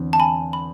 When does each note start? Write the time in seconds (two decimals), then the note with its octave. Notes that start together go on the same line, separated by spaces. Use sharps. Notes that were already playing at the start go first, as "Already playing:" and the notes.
Already playing: E2 D3 C4
0.13 A5
0.20 G#5 B5
0.53 B5